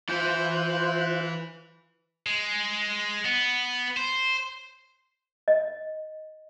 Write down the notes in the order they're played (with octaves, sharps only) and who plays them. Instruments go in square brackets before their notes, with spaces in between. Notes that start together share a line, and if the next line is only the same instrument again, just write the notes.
[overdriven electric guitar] E3 E4 [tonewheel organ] F4 C5 F#6 [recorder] G6
[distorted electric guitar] G#3
B3
C5
[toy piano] D#5